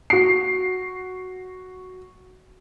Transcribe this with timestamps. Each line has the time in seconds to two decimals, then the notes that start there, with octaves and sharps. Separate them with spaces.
0.10 F#4 C7